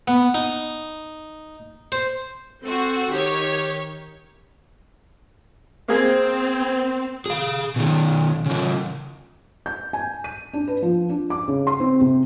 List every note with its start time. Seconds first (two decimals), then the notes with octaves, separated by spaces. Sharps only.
0.08 B3
0.34 D#4
1.92 C5
2.64 C4 F#4 A4
3.11 D#3 G4 C#5
5.88 A#3 C4 G#4
7.26 G#4 F5
7.76 B2 D#3
8.46 C#3 E3
9.66 G6
9.93 G#5
10.24 D#7
10.54 D4
10.67 B4
10.82 F3
11.09 D4
11.30 D6
11.48 C#3
11.67 C6
11.80 C4
12.01 C3